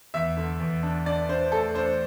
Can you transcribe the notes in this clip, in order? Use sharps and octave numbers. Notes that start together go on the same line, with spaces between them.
E2 E5
D3
E2
D4
D4 D5
D4 C5
A3 A4
D4 C5